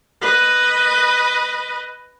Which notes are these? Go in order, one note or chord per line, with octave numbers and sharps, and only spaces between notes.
B4 D#5